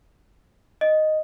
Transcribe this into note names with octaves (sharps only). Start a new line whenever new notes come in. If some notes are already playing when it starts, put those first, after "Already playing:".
D#5